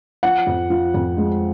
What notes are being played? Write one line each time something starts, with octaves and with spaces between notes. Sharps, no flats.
F3 F#5
F2
F3
F2
G#3